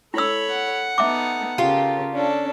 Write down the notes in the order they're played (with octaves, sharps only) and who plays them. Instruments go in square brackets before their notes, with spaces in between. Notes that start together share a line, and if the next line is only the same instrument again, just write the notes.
[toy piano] E4 E6 [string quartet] A4 C#5 B5
[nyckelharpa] F#5
[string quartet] B3 D#4 A4 [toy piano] E5 D6
[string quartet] C#3 A4 A#4 [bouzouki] F4 G4
[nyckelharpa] C#4 [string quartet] D4 A4